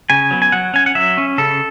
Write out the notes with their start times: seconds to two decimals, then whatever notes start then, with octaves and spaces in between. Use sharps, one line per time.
0.10 C#3 G#5
0.31 F#3 B3
0.42 G#5
0.52 F#3 F#5
0.74 C#4 G#5
0.86 F#5
0.95 F#3 E5
1.18 C#4
1.38 C#3 A4